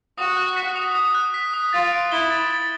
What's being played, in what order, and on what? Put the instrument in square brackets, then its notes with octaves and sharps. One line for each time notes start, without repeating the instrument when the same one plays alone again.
[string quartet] F#4 [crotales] D#6
[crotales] F#6
B6
D#6
D#6
F#6
B6
D#6
[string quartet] F4 [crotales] A6
[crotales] D7
[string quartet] E4 [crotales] G7
[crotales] A6
A6